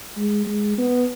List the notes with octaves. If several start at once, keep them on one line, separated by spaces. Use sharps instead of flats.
G#3
G#3
B3